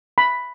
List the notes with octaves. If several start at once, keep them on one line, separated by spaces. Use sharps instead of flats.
B5